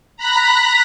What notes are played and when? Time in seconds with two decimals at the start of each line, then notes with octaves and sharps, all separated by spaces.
0.17 A#5 B5 F#6 A#6 B6